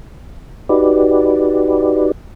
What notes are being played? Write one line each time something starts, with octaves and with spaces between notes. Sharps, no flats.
D#4 F#4 G4 B4 D5